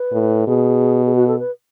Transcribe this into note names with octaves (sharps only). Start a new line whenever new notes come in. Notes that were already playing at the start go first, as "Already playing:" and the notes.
Already playing: B4
A2
B2 G#4
G#4
F#4
A4
B4